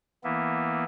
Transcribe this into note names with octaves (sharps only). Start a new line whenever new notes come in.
E3 A#3 B3 E4